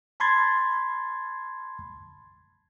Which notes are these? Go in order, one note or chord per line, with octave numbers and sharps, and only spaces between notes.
A5 B5 C6 G#6 A6